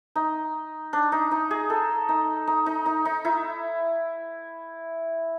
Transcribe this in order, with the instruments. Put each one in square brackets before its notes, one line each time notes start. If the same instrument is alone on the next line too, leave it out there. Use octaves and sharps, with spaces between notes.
[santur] D#4
D4
D#4
D#4
G#4
A4
D#4
D#4
D#4
D#4
D#4
E4